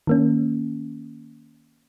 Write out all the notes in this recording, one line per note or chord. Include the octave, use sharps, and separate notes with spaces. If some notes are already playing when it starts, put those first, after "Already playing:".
D#3 A#3 C#4